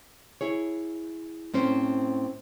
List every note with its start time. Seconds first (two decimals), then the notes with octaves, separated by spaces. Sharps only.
0.41 E4 G#4 C#5
1.54 A2 C4 C#4 C5